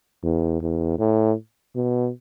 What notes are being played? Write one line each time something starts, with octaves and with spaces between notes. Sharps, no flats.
E2
E2
A2
B2